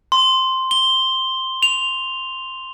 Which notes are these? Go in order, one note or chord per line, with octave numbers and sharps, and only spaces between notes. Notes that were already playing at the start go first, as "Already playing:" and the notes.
C6
G7
F7